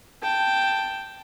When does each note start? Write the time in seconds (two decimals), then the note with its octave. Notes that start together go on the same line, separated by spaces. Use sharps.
0.23 G5 A5